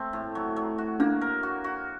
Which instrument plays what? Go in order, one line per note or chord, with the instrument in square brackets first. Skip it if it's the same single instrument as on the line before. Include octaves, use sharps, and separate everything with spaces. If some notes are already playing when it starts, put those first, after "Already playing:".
Already playing: [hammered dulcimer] A3 C4
A2
F#3
F#3
F#4
[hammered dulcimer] A#3 [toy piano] D4
[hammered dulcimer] A#4
F#4
F#4